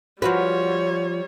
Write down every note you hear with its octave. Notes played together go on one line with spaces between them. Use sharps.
F3 G3 F#4 B4 C#5